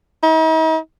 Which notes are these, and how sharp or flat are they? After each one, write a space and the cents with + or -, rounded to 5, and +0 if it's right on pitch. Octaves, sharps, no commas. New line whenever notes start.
D#4 +45